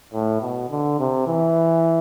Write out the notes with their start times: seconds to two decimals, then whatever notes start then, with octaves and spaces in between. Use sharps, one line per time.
0.14 A2
0.42 B2
0.70 D3
0.99 C3
1.27 E3